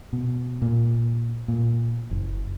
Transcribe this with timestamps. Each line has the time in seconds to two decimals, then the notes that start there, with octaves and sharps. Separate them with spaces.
0.13 B2
0.62 A#2
1.48 A#2
2.11 F#1